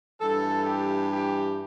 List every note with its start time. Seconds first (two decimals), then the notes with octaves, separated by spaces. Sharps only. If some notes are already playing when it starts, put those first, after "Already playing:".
0.20 G2 E3 A4
0.65 G4
1.11 G4